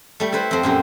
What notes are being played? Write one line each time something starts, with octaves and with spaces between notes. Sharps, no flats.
G3 A3
E4 A4 B4 C5
F2 C4
F#2 A#2 G4